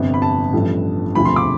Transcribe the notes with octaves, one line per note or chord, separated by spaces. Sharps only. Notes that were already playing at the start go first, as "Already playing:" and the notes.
Already playing: G1 F2 C3
B5
A5
A1 G2 F3 A3
E1 D2 C3 F3 B5
C6
D6